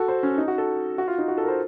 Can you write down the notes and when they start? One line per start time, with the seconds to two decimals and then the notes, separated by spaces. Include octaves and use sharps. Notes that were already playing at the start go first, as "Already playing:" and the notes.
Already playing: F#4 A4
0.08 C5
0.23 C#4
0.38 D#4
0.48 F#4
0.58 A4
0.98 F#4
1.08 F4
1.18 D#4
1.28 F#4
1.37 A4
1.43 A#4
1.48 C5